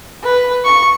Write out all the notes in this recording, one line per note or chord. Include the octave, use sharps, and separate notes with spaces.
B4
C#6